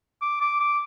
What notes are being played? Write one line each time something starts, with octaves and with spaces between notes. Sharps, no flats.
D6
D6
D6